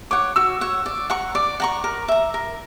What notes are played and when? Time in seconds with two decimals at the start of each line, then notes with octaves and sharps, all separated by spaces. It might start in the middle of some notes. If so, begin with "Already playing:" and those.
0.11 C#5 F#5 D6
0.36 F#4 E6
0.61 C#5 F#5
0.86 D5
1.10 F#5 A#5 C#6
1.35 D5 D6
1.60 F#5 A#5 C#6
1.84 A#4
2.08 E5 A#5
2.34 A#4